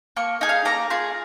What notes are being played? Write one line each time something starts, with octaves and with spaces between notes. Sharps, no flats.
A#3 C#6
D#4 G#4
F5
A#3 A#5
F4 G#4